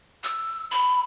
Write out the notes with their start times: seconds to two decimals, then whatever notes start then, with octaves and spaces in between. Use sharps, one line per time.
0.24 E6
0.71 B5